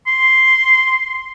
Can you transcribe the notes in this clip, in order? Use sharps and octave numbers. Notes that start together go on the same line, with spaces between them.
C6